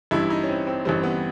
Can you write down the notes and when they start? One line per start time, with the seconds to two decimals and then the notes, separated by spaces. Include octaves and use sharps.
0.11 A1 G2 E3 G3 E4
0.30 D#4
0.44 C#4
0.49 C4
0.67 C4
0.85 A1 G2 E3 G3 C4
1.03 B3